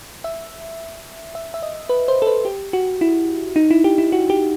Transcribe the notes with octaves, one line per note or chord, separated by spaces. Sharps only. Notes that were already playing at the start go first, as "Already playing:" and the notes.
E5
E5
E5
D#5
B4
C5
A4
B4
G4
F#4
E4
D#4
E4
G4
E4
F#4
G4